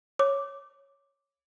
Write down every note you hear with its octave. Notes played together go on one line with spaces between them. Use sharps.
C#5 D6